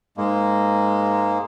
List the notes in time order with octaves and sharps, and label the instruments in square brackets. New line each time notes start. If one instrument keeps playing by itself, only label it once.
[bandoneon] G#2 G#3 A#3